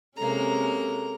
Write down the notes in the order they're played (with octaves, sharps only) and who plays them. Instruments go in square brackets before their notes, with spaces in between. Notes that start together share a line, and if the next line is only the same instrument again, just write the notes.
[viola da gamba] C3 G#3 C#4 [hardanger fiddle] A#3 A#5 [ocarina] A4